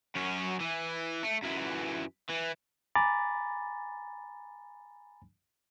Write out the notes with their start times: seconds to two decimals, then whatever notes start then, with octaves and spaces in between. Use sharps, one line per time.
0.15 F#2 C#4
0.61 E3
1.23 A3
1.42 F#2 E3
2.29 E3
2.96 G#5 A#5 B5 D6 A6